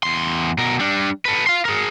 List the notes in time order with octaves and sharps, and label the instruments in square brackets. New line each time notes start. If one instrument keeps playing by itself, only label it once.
[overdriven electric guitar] E2 C6
B2 A#4
G3 D4
A4 B4
F5 C6
G#4 A#4